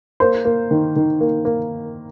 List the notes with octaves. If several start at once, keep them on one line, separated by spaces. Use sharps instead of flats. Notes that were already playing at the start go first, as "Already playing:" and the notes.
A#3 C5
A#3
D#3
D#3
A#3
A#3